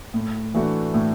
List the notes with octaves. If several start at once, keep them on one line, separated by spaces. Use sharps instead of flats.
A2
E3 A3 D4 F#4
A2